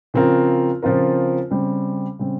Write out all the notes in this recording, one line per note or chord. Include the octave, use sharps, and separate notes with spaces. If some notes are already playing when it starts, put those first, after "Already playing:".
C#3 F3 C4 F4 A#4
C#3 F3 C4 F4 A#4
C#3 G3 C4
C#3 G3 C4